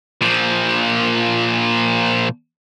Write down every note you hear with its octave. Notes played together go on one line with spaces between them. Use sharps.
A#2 F3